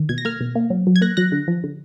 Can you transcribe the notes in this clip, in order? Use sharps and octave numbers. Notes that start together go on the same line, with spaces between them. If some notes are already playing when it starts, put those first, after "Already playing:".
Already playing: D#3
B2 G#6
A#6
A#3 F6 G#6
B2
A#3
F#3
F#3
G#6
A#3 F#6 A#6
F#3 F#6 A#6
D3
F3
D3